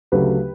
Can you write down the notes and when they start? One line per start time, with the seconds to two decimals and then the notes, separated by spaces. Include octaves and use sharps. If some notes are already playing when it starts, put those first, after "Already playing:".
0.12 D2 C#3 F#3 A3 G4 B4